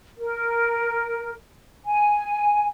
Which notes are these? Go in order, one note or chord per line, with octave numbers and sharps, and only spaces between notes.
A#4
G#5